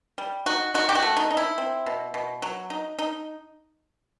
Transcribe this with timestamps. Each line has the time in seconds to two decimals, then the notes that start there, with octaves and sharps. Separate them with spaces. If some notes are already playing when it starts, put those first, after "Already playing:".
0.18 G3
0.46 D#4 F#4
0.74 D#4 F#4
0.89 G4
0.95 F#4
1.02 A3
1.17 D#4
1.31 D#4
1.37 E4
1.58 C4
1.86 B2
2.14 B2
2.42 F#3
2.70 D#4
2.99 D#4